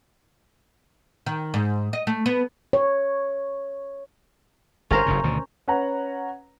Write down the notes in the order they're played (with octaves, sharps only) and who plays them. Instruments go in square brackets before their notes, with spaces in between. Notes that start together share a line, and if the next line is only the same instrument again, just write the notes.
[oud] D#3
G#2
D#5
A3
B3
[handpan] C#5
[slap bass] G1 G2 [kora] C#4 A#4 C5
[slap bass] F#1 G2 C#3
D2 B2 D#3
[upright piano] C#4 B4 F#5 A#5